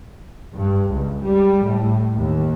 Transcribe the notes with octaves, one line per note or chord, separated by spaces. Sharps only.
G2
C#2
G3
A2
D#2